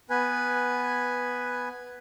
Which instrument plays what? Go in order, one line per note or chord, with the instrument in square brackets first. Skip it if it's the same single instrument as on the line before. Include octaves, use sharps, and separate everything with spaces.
[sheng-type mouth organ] B3 B4 G#5